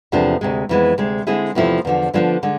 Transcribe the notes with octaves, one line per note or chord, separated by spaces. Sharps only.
E2 C3 F3 A3 D4
D2 C3 G#3
F2 E3 G#3 B3
D2 C3 G#3
D3 G#3 C4 E4 G#4
E2 C3 F3 A3 E4
E2 D3 F3
D3 F3 G#3 B3 D4
D3 G#3